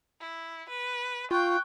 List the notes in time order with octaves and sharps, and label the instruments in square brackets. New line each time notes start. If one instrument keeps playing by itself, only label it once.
[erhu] E4
B4
[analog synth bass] F4 [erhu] G5 [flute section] C#6 F#6